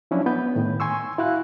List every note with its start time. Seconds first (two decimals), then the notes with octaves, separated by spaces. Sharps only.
0.11 F3 F#3 C#4 D4 E4
0.26 B3 B4 G6
0.55 A2 D#3
0.80 G#5 C6 C#6 E6
1.18 E4 F#4 F5 F#6